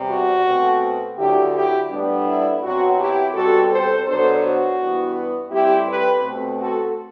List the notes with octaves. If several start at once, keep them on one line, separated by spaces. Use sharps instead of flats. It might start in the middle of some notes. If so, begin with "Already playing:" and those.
Already playing: E2 C3 G3
F#4
B2 A3 C4
D2 D3 F#3 E4 G4
E4 G4
A2 G3 B3 D4
E4
B2 F#3 C4 F#4
E4 G4
B2 G3 C4 F#4 A4
A4 C5
B2 F#3 B3 D4 A4 C5
F#4
G2 E3 B3
A2 G3 C4 E4 G4
G4 B4
B2 A3 C4
F#4 A4